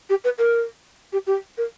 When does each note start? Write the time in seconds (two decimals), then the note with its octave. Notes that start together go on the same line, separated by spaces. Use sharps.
0.09 G4
0.24 B4
0.38 A#4
1.12 G4
1.27 G4
1.57 A#4